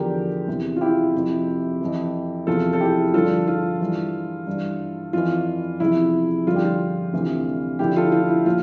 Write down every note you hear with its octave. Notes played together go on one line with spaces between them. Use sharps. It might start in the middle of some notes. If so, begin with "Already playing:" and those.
Already playing: E2 D3 F3 G4 A#4
E2 C3 E3
F4
E4 G4
F2 C3 F3
F2 E3
E2 C3 F3 F4 A4
A4
E4 G4
G2 D3 F3 F4 A4
F4 A4
G2 E3
G2 E3
F2 E3 F4
E2 C3 F3 E4
G2 D3 F3 F4
G4
F4
D2 C3 E3
D2 D3 F3 E4 G4
F4 A4
F4
E4
A#2 F3 F4